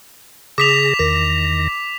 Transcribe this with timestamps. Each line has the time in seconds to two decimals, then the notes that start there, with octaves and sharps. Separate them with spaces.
0.58 C#3 G#4 D6 A#6 B6 F7
0.99 E2 D#3 A#6